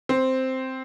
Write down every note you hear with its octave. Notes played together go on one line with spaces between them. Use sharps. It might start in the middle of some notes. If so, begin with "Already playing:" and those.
C4